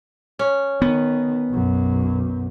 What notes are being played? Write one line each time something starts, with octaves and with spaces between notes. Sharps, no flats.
C#4
D#3 B3
B1 F#2